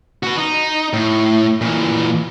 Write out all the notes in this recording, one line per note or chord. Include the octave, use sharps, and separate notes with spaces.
F#4 B4
D#4
A2
A#2 E3